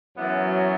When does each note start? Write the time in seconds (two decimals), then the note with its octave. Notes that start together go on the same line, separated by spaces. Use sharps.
0.17 F#2 E3 F#3 B3